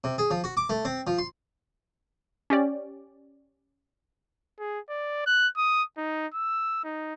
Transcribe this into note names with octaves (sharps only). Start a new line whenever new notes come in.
C3
G#4
F3
F#4
D6
A3
C4
F3
C6
C#4 G4 D5
G#4
D5
F#6
D#6
D#4
E6
D#4